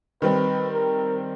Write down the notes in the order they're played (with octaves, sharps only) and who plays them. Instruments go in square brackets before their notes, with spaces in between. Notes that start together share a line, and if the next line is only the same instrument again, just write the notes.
[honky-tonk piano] D#3 G3 C4 [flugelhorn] B4
[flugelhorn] A#4